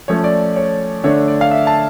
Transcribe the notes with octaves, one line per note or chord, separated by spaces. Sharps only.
F3 A3 C#4 C#5
D5
C#5
D3 A3 D4 C#5
D5
F5
E5
A5